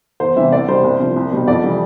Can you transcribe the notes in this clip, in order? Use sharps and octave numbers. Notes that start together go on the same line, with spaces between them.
E2 C5
C3 E3 G3 E5
C2 D5
B2 G3 C5
C2
C3 F3
C2
B2 G3
F2 D5
E3 G3